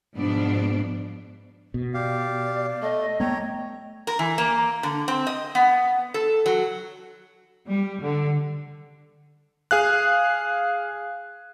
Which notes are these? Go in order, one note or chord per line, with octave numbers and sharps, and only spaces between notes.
G#2 B2 F3 B3 D4
B2
G4 D5 F5
A3 D#5
A3 B3 C#5 G5 A#5
A#4
E3
A#3
D3
C4
D#5
B3
A4
F#3
G3
D3
G#4 F5 F#6